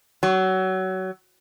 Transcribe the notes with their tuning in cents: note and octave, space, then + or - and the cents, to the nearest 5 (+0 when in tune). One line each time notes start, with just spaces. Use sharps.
F#3 +25